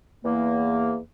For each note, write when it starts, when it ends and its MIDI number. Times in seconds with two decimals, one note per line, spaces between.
0.25 0.98 40
0.25 0.98 58